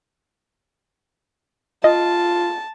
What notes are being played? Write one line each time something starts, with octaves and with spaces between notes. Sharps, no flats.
F4 D#5 A5